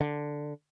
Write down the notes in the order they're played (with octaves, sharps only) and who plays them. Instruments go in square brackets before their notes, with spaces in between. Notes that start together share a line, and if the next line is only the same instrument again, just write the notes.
[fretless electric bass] D3